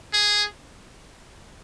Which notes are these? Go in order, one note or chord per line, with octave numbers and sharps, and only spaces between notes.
G#4